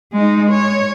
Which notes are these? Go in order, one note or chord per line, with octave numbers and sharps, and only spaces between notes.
G#3 D#4
C#5